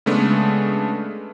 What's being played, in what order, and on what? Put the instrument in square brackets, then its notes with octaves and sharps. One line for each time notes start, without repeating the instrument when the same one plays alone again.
[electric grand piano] C#3 G#3 A3 B3 D4